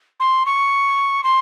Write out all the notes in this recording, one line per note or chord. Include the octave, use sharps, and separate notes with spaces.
C6
C#6
C6